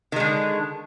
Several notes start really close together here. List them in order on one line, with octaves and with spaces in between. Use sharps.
D#3 G#3 D3